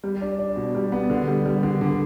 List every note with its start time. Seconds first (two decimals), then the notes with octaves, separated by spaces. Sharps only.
0.04 G3
0.21 D4
0.39 D4
0.56 B2
0.75 G3
0.92 B3
1.10 D3
1.28 G3
1.45 G3
1.63 D3
1.81 D3